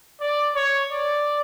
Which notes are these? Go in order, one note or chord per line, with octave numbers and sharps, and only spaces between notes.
D5
C#5
D5